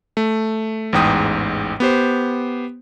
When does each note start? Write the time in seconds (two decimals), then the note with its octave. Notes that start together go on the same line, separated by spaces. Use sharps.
0.17 A3
0.93 A1 E2 G#2 G5 D#6
1.80 B3 G4 C5